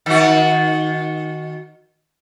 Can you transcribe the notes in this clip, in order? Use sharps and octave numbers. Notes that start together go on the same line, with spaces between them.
D#3 F#4